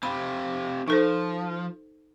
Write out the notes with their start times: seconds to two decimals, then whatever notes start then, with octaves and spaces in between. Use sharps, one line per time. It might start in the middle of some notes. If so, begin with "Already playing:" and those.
0.03 C4 F4 G4 B5
0.88 F3 D#4 A4 C5